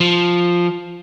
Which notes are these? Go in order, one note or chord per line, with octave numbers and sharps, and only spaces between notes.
F3